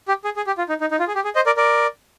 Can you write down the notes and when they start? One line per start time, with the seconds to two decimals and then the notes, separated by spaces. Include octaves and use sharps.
0.08 G4
0.24 G#4
0.36 G#4
0.47 G4
0.58 F4
0.69 D#4
0.81 D#4
0.91 D#4
1.00 F4
1.08 G#4
1.15 G4
1.24 G#4
1.35 C5 D#5
1.46 A#4 D5
1.57 A#4 D5